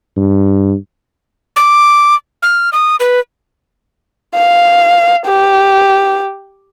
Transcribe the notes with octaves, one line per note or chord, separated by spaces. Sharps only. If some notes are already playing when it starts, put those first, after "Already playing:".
G2
D6
F6
D#6
B4
F5
G4